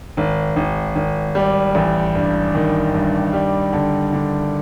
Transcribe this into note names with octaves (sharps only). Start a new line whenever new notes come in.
G#1
G#1
G#1
G3
A1
G2
D#3
G2
G3
D3
D3